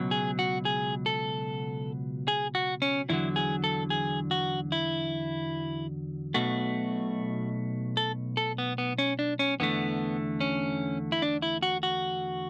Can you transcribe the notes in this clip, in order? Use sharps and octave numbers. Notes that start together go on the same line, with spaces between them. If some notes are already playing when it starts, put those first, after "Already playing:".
Already playing: C#2 B2 F#3
G#4
F#4
G#4
A4
G#4
F#4
C#4
E2 D3 F#3 E4
G#4
A4
G#4
F#4
E4
B1 B2 A3 F#4
A4
A4
B3
B3
C#4
D4
C#4
E2 D3 A3 B3
C#4
E4
D4
E4
F#4
F#4